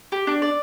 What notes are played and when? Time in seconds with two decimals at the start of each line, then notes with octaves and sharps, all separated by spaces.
0.12 G4
0.27 D4
0.42 D5